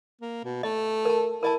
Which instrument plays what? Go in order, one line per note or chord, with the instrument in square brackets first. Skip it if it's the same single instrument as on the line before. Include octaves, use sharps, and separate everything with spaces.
[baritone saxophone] A#3
B2
[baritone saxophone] A3 [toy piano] D#5
[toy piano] A#4 A5
[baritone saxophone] E4 [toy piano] A#4 D#5 A5